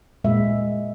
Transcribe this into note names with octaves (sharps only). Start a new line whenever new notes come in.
A#2 G#3 E5